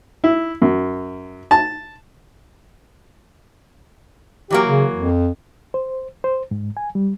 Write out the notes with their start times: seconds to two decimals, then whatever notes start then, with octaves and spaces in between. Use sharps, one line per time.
0.24 E4
0.62 F#2
1.51 A5
4.50 E3 F#3 A#3 G4
4.67 C#3
4.96 F2
5.74 C5
6.24 C5
6.51 G#2
6.77 G#5
6.95 G3